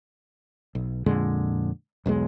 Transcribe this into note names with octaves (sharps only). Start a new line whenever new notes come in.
B1
F2 A#2 D3 G#3
E1 B1 E2 G#3